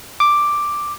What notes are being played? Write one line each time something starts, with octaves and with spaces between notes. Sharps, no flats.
D6